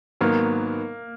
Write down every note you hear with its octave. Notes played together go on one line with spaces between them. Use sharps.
G#2 D#3 F#3 A#3 B3